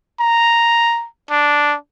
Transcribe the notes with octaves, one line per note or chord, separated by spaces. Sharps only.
A#5
D4